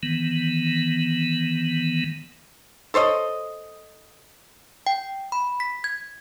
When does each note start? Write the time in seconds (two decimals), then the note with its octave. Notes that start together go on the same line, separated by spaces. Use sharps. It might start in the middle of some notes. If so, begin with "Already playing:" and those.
0.03 D#3 E3 B3
2.94 A4 C5 C#5 D#5
4.87 G5
5.32 B5
5.60 B6
5.84 G#6